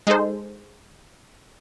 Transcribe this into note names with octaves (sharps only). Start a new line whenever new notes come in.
G#3 D#4 G#4 A4 C5